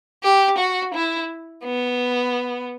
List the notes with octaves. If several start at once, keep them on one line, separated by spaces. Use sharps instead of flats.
G4
F#4
E4
B3